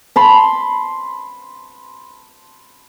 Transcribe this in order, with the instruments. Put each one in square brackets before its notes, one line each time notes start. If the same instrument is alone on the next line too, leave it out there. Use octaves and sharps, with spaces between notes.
[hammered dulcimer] A5 B5 C6